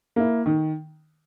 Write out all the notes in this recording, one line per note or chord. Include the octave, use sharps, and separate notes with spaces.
A#3 E4
D#3